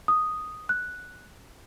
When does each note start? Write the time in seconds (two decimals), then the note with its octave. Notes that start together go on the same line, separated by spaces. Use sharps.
0.08 D#6
0.69 F#6